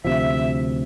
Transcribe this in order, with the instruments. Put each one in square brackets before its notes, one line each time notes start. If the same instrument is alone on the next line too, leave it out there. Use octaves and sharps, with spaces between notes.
[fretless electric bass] D2 C3 F3 [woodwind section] E5